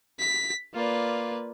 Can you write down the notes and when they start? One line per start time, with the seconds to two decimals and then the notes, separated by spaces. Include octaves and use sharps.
0.20 B6
0.74 A#3 F4 B4 D5